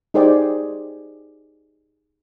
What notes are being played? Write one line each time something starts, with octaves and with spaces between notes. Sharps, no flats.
D#4 G4 G#4 C5 D5 G5